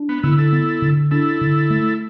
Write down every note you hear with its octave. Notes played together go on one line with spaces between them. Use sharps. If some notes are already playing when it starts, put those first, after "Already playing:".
Already playing: D4
B3
D3 B3 E4
E4 A4
B3
D3
D4 E4 A4
D3
A3